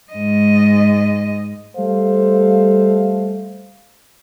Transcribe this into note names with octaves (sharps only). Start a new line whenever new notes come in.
G#2 D#5
G3 A3 A4 C5 F5